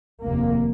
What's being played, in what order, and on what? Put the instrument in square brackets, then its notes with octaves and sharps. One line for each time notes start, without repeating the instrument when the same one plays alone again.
[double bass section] F1 D#2 A#3